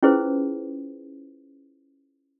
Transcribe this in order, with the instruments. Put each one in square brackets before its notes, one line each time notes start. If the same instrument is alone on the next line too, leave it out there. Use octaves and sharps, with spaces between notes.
[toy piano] C#4 E4 F4 G#4 B4 C5